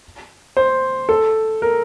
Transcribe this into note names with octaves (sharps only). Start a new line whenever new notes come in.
C5
A4
A#4